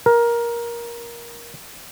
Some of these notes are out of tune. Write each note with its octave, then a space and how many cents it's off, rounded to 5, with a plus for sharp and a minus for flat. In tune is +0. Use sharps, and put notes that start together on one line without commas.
A#4 +15